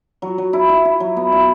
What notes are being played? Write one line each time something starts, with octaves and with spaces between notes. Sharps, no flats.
F#3
F#3
E4
E4
E4
F#3
B3
E4